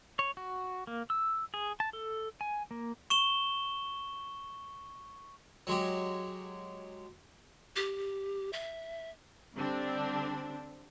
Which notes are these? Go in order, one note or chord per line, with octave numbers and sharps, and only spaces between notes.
C#5
F#4
A#3
E6
G#4
A5
A4
G#5
A#3
C#6 E7 G7
F#3 G#3 G4
G4
E5
D3 G3 C4 D4